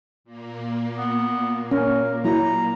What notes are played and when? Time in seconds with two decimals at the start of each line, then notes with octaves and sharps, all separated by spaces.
0.24 A#2 A#3
0.97 B3
1.71 C#4 A#4
2.24 F#3 E4 A#5